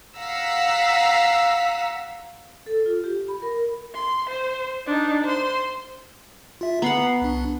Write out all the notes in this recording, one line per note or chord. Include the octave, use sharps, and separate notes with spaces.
F5 F#5 A#5 E6 B6
A4
F4
G4
B5
A#4
C6
C5
D4 D#4
C5 C6
F4 E5
B3 F#5 A#5 C7
C2 D4